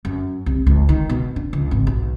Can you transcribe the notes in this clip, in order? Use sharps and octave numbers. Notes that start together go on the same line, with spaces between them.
F#2
C2
C#2
D#3
B2
D4
C#2
G#1
B1